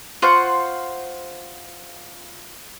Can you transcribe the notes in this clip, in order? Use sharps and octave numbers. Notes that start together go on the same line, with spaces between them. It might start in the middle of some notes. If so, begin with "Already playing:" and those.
F4 C5 F#5 C#6